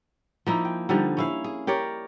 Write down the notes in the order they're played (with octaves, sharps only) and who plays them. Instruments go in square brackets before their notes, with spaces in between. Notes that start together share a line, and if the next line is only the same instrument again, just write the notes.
[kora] F3 A#3 D#4 E4
G5
D3 F3 G3 D#4
C#4 E4 F5
G#4
G4 A#4 C#5 D5